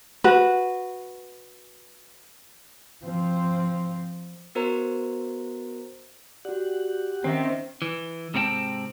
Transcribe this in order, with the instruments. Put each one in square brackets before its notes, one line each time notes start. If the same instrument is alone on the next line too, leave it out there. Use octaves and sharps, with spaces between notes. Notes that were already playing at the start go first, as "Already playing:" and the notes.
[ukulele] F#4 B4
[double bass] F3 C4
[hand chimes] B3 F#4 A#4 C5 A#5
[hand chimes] F#4 D5 [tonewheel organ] G4 F#5
[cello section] D#3 [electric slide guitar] C4 [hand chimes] C#4 D#5 E5
[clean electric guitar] E3
G#2 C3 B3 C4 G5 A5